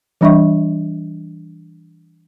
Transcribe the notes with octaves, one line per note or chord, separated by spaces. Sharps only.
E3 G3 D4 D#5 E5 C#6